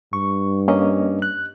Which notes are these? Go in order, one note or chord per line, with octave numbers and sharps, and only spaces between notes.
G2 C#6
A#3 C#4 D#5
F#6